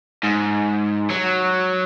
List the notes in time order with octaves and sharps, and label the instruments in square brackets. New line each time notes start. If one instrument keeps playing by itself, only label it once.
[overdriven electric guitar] G#2
F#3